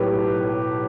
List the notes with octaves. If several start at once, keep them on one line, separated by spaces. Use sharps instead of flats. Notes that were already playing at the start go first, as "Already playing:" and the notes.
Already playing: B1 A2 G4 B4